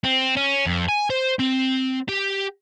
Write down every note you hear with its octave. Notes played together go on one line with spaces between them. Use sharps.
C4
C#4
F2
G#5
C5
C4
G4